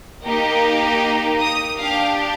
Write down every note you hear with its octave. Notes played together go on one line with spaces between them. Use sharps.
A#3 D#4 G4
D#6
D4 G4 F5